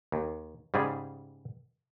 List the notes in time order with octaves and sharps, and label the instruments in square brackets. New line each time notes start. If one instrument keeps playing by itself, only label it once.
[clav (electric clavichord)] D#2
G#2 C#3 G3 G#4